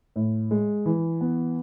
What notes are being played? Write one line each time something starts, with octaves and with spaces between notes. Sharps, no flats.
A2
G#3
E3
B3